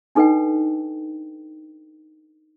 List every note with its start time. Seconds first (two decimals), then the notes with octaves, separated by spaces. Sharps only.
0.15 D4 D#4 A4 B4 D#5 G5